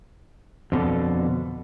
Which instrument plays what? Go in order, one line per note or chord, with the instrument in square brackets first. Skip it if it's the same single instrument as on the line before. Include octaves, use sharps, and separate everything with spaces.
[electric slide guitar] F2 B2 D3 A4